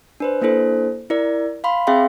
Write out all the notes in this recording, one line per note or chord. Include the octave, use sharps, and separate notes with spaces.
D4 B4 C5
A#3 D4 E4 A4 C5
E4 A#4 D5
F5 B5 C6
C4 G#4 E5 F5 G5 C6